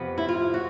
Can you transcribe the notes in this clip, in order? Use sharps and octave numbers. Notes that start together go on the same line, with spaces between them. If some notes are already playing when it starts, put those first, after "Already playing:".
Already playing: F2 C3 F3 B3
E4
F4
F#4